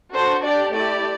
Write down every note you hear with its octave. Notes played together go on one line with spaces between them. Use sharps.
D4 F#4 A4 C5
D4 G4 D5
A3 E4 G4 D5